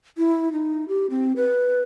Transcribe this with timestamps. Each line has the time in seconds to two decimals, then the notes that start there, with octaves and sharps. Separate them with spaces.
0.18 E4
0.53 D#4
0.88 G4
1.10 C4
1.36 B4